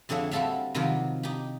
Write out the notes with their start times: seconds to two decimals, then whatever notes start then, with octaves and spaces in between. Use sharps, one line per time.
0.09 F2 D3 G#4 C#5 E5
0.31 G3 C4 F#4 A4 E5 F5
0.75 C3 D#3 F3 F#3 A#4
1.23 D#4 G4